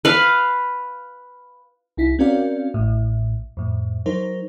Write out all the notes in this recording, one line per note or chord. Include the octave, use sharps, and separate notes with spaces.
B4 F5
C2 D#4 E4 B6
C4 C#4 F#4 A#4 D5 F5
A1 A2
F2 A2
F#3 D#4 A#4 C5